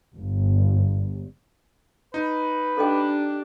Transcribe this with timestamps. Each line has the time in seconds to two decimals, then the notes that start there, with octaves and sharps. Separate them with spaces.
0.15 G1
2.14 D#4 B4
2.77 D4 G4 A4 D#5 G5